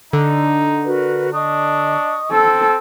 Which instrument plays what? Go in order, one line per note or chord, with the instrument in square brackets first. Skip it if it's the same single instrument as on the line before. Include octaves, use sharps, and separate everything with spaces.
[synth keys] D3 [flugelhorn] D#4
[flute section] F#4 A#4 B4
[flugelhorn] D4 [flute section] D#5 C#6 D#6
[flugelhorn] C4 [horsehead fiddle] A4 [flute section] E6